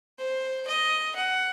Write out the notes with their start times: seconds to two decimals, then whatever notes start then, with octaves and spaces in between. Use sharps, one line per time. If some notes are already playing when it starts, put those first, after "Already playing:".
0.19 C5
0.67 D#5
1.15 F#5